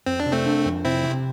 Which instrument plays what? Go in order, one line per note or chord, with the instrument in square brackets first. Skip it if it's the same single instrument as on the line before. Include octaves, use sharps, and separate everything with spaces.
[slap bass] F2 [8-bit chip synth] C4
[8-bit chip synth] D4
[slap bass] C3
[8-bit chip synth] A3 C4
[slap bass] D4
F2
[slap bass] C3 [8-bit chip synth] C4 E4
[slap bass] C3